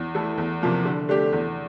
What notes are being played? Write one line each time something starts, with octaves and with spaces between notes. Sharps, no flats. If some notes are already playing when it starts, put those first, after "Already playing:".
Already playing: E2
E3 A3 E4 A4
E2
C3 F3 A#3
D3
A3 D4 G4
E2